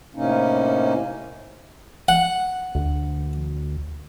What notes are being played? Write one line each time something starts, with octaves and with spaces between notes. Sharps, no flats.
A2 C3 A#3 C#4 D#4
F#5
D2